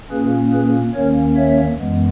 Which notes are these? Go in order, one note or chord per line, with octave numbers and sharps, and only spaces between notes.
A#2 A#3 C#4 G#4 B4
G#4 B4
D#2 D#3 A#3 C#4 A#4 C#5
C#5 E5
F#2 E3 G#3 B3